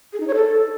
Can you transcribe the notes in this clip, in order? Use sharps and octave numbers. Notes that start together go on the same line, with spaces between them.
G#4
D#4
C#5
A4